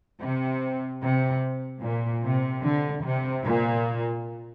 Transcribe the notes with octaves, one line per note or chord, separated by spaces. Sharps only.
C3
C3
A#2
C3
D3
C3
A#2